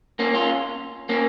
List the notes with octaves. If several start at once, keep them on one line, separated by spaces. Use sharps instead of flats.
A#3 C#4
C#4 F4
A#3 C#4